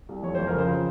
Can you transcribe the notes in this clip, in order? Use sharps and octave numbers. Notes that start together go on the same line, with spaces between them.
C2
F2 C#5
F2 C5
A#4
C#3
C5
F3